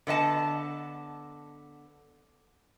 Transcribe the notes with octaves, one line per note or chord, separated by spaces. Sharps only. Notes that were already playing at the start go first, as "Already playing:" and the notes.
D3 B3 D#5 A5